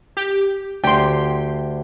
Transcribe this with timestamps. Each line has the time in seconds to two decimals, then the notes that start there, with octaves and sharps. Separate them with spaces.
0.17 G4
0.84 D2 G4 G5 C6